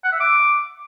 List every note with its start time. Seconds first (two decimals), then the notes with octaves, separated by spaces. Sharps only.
0.04 F#5
0.12 E5
0.20 D6